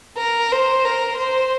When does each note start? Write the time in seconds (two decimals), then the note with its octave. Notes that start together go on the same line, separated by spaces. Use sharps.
0.18 A#4
0.52 C5
0.85 A#4
1.18 C5